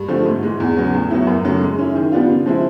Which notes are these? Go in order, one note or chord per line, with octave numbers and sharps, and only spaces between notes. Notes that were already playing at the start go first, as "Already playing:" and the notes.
Already playing: G2
D3 F3 A3 C4
G#2
E3 G#3
E2
C#3 F#3 B3
A2
F#3 B3 E4
F#2
C#3 F#3 A3
G#3
C#4 E4
D#3
G3 B3 D4 F4
C#3
F3 G#3 C4 E4